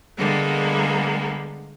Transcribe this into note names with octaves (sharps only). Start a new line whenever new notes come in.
D3 G3 G#3 A#3 B3